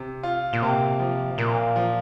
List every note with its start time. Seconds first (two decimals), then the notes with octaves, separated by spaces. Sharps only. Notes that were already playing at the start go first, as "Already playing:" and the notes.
Already playing: C3
0.23 F4
0.53 A#2
0.62 C3 A#3
1.00 F3
1.38 A#2 A#3
1.76 F3